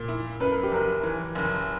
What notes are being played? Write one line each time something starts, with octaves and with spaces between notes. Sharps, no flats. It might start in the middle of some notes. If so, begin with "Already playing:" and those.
Already playing: A#2
E4
F#2 B4
A#4
G4
F#1 A#4
E3
F#1